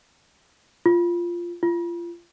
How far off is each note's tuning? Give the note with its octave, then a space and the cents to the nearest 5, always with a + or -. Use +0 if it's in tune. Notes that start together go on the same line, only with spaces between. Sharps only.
F4 -10
F4 -30